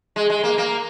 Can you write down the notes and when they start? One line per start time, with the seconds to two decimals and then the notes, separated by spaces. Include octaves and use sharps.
0.16 G#3
0.30 G#3
0.44 A#3
0.58 A#3